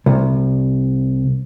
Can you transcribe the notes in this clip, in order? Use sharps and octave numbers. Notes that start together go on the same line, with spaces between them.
C2